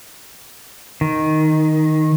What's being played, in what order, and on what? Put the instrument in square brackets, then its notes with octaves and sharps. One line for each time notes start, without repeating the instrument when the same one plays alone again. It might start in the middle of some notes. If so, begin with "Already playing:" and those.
[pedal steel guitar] D#3